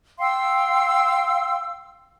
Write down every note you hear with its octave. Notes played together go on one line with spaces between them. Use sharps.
F5 G5 C6 E6